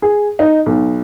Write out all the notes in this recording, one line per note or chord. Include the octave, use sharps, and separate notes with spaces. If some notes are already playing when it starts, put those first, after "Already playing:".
G#4
D#4
B1